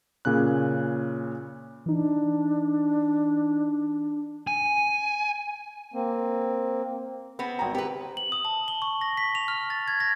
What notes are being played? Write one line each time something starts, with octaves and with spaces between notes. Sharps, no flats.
A#2 C#3 C#4 F#6
E3 D4 D#4
G#5
A#3 C4
B3 C4 B5
G#1 G5 A#5
C4 G4 B4
F#7
D#6
A5
G7
C#6
A#6
B6
F7
F6
A6
G#6
A#6